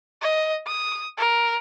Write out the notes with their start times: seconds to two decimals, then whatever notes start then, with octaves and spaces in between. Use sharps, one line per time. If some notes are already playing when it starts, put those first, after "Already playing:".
0.22 D#5
0.67 D#6
1.18 A#4